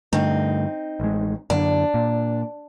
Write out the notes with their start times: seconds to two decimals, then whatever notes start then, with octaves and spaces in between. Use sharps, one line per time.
0.13 G2 D3 A3 C4 D#4
1.00 A1 G#3
1.50 F#2 D3 D4
1.94 A#2